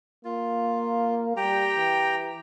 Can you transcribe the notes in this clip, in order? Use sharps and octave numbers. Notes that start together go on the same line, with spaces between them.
A#3 F4
G3 G4 G5 A#5
E3